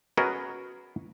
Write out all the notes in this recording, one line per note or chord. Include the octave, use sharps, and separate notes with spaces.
B3 C#4 F#4 G#4 A#4 D#5